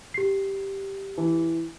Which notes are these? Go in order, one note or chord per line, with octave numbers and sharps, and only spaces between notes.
G4 C7
E3